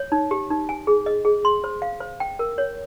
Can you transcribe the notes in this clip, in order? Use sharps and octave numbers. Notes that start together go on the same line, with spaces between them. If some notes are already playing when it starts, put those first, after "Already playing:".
Already playing: C#5
D#4
G4
D#4
G#5
G#4
D#5
G#4
C6
C5
F5
C5
G5
A#4
C#5